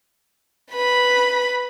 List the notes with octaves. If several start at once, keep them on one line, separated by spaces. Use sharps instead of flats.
B4 B5